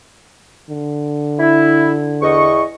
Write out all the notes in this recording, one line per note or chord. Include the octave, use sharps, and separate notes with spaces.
D3
E4
E2 D#5 C#6